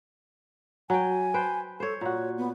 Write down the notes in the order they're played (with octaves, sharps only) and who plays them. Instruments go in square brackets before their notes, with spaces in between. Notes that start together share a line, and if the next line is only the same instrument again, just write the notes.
[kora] F#3 G5 [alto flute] G#5
[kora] B4 C5 G5
[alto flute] A4 [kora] C5 C#5
[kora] A#2 F#4 [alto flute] C#5
[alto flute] B3